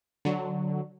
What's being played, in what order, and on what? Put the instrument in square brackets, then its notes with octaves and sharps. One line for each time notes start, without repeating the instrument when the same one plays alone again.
[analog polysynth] D3 F#3